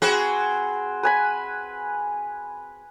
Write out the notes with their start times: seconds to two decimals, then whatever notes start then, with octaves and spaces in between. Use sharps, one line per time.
0.02 C4 F#4 G#4 B4
1.03 B4 G#5 B5